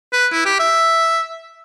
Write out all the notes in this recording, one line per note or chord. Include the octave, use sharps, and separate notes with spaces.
B4
E4
G4
E5